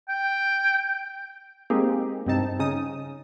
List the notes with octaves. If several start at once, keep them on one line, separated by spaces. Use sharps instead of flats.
G5
G#3 A#3 C4 D#4 G4 G#4
G2 C3 C4 D#4 A5
C#3 C#4 D#4 D#6